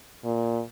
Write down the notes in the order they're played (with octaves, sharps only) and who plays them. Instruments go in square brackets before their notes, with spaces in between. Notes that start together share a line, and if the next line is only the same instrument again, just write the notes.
[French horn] A#2